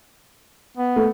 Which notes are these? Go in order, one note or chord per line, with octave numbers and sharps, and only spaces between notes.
B3
A3